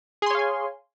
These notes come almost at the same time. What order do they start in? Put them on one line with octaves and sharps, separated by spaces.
G#4 C6 C#5 F5 G#5